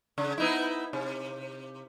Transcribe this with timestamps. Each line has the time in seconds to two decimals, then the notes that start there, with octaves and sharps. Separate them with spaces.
0.18 C#3
0.38 B3 D#4 E4
0.93 C3